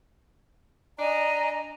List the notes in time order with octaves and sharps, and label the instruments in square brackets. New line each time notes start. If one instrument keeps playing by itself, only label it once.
[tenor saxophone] D4 [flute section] D#5 G#5 A#5